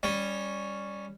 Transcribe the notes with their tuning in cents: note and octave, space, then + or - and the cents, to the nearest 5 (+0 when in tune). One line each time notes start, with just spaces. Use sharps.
G3 +15 C#4 +0